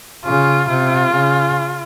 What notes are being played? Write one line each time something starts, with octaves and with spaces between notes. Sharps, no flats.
C#3 F4
C3 F4
C#3